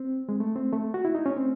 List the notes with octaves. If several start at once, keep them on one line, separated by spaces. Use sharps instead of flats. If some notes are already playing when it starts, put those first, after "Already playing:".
Already playing: C4
G#3
A3
C4
A3
F#4
E4
D#4
C#4
C4